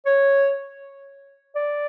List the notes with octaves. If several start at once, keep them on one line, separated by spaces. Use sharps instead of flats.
C#5
D5